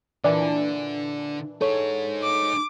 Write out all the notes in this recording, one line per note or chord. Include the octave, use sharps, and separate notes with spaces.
A#2 D3 E3 D4 D5
D#4 G#4 A4 C#5
D6